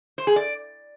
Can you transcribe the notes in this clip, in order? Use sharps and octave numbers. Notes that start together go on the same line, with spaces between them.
C5
G#4
D5